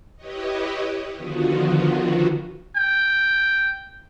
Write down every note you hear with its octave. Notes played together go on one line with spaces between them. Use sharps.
E4 G4 B4 C#5 D#5
D3 D#3 F3 B3 F4 F#4
G5